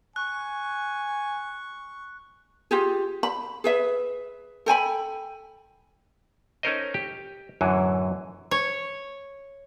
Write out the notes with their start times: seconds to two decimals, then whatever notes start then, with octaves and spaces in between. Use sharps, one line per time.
0.16 G#5 C#6 F#6
2.71 F4 G4 G#4
3.23 B5
3.64 G#4 B4 E5
4.66 A4 G5 G#5 B5
6.63 C#4 D#4 A4 A#4 C5 D#5
6.94 G4
7.61 F#2 A2 D3 E3 F#3
8.51 C#5